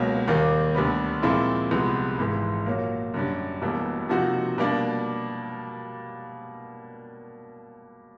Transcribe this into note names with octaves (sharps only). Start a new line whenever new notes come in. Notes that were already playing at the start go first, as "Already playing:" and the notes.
Already playing: C#2 B2 F#3 A#3
D#2 D#3 G3 A#3
D2 D3 G3 B3
A#2 F3 G#3 C4 E4
C2 C3 F3 G#3 B3
G#1 G#2 E3 G#3
A#2 F#3 A#3
F#2 D3 G3
E1 E2 B2 G3 A#3
C3 F3 A#3 D#4 F#4
B2 G3 A#3 D4